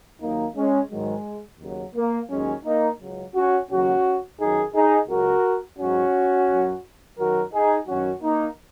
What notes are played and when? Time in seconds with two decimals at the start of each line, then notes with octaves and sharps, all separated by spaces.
0.20 D#2 D#3 F#3 A#3 D#4
0.55 G#3 C#4
0.90 G#2 D#3 F#3 G#3
1.59 D#2 C#3 F#3
1.94 A#3
2.29 D#2 D#3 F#3 G#3 C#4
2.64 A#3 D#4
2.99 C#2 C#3 F#3
3.34 C#4 F#4
3.69 D#2 C#3 F#3 C#4 F#4
4.38 F#2 D#3 F#3 D#4 G#4
4.74 D#4 G#4
5.08 C#2 C#3 F#3 F#4 A#4
5.78 G#2 F#3 C#4 F#4
6.48 F#2 F#3
7.17 F#2 D#3 F#3 F#4 A#4
7.52 D#4 G#4
7.87 F#2 D#3 F#3 C#4 F#4
8.21 A#3 D#4